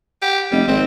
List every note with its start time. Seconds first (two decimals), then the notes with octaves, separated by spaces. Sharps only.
0.22 G4 F#5
0.51 F1 G3 D#5
0.68 G#1 C4